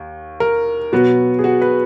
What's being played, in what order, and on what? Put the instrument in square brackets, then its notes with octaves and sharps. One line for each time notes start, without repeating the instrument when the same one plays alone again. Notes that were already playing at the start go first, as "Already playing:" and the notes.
Already playing: [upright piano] D#2
A#4
B2 F#3 B3 F#4
G#4
F#4
B4